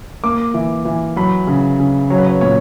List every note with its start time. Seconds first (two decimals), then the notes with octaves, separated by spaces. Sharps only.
0.24 A#3 D6
0.54 E3
0.85 E3
1.16 F#3 B5
1.47 C#3
1.80 C#3
2.10 F#3 C#5
2.18 B4
2.27 C#5
2.41 A#2 C#5